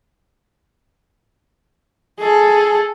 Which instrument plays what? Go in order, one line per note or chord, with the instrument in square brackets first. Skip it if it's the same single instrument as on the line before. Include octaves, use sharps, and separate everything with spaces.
[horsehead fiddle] G#4 A4